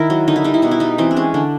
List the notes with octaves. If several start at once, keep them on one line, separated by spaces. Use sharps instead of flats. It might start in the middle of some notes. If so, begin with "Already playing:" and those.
Already playing: D#3 E4 A#4
F#3
D3 D#4
E4
G3 D#4
E4
B2 D#4
E4
G3 D#4
E3 C4
D4
G#3 C#4
D3 D4